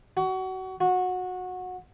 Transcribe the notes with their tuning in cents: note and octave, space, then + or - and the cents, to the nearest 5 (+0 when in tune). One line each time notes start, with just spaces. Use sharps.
F#4 +25
F#4 -20